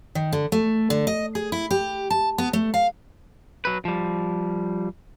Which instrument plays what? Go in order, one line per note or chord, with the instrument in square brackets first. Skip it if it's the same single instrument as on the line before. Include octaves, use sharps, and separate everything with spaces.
[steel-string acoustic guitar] D#3
D3
A3
D3
D#5
G#4
E4
G4
A5
B3
A3
F5
[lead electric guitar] F#3 B4
F3 G3